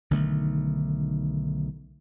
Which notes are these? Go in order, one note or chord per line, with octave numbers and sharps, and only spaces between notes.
B1 D3 D#3 A3